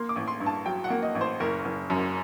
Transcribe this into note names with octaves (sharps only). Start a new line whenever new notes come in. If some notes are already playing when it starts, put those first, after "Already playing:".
Already playing: A#3 C6
D6
A1
C6
G2
A5
F#3 G5
F#5
A#3
D#5
A1
C5
F#1 A#4
F#1
F#2